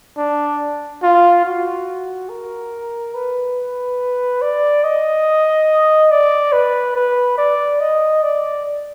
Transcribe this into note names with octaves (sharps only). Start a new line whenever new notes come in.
D4
F4
F#4
A#4
B4
D5
D#5
D5
B4
B4
D5
D#5
D5